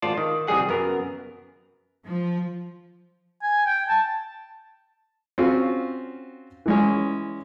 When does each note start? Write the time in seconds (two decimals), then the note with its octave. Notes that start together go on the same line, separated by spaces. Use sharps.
0.02 G#1 F4 C5 D5 A5
0.17 D#3
0.47 C3 E3 G3 G#4 F#5
0.69 F#2 B3 A#4
2.04 F3
3.43 G#5
3.66 G5
3.89 A5
5.38 C4 C#4 F4 F#4
6.66 E3 G#3 C#4